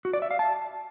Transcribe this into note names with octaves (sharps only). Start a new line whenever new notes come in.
F#4
D5
E5
F5
A5